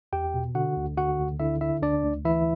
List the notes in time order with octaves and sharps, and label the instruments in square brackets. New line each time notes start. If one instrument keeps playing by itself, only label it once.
[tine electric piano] E2 G4 G5
B2
D3 F#4 F#5
D2
D3 F#4 F#5
D2
D3 E4 E5
D3 E4 E5
D2 D4 D5
D2
E3 E4 E5